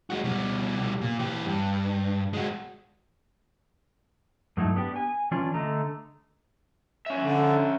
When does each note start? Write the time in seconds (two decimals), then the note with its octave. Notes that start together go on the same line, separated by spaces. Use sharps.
0.10 G#3 F#4
0.24 B2 G3
1.01 A#2
1.19 E3 G4
1.47 G2
2.34 G#3 F#4
4.57 G2 F#3 A3 D#4 E4 A4
4.76 B3 D4 G4
4.96 G#5
5.31 E3 C#4 D4 F4
5.54 D3 A3 D#5 A#5
7.06 C#4 E5
7.23 D3